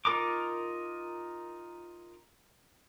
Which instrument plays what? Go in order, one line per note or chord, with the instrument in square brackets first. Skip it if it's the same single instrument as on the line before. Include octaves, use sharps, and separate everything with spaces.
[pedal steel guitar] D#4 F4 A#4 A#5 D6